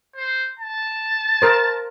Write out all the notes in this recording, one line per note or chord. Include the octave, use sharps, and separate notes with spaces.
C5
A5
A#4 C5